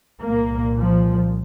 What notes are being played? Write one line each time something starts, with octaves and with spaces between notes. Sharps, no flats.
C2 A#2 A#3
F3